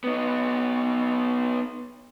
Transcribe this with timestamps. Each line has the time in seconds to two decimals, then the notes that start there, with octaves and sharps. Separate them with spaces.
0.04 B3 D#4